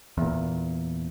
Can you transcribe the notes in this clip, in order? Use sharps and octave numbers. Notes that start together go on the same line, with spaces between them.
E2 A#2